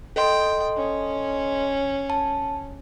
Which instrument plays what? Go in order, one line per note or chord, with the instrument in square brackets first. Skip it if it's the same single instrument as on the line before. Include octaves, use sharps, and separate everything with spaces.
[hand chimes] A4 D#5 C6 [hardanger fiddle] G5
[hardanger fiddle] C#4
[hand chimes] A5